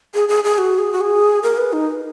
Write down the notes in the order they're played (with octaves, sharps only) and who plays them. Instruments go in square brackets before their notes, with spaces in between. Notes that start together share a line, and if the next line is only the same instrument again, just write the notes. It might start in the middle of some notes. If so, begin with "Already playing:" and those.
[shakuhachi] G#4
G#4
G#4
F#4
G#4
F#4
G#4
A#4
B4
D#4